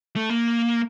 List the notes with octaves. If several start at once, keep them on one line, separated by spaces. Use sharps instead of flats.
A3
A#3